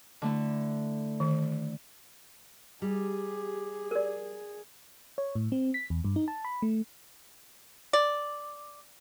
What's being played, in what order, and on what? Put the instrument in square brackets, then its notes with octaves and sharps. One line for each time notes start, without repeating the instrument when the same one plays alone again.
[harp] D3 A3 E4
[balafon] D#3
[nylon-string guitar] G3 [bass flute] G4 [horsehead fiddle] G#4
[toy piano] A#4 D5
[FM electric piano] C#5
A2
C4
B6
E2
G2
D#4
A5
B5
A3
[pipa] D5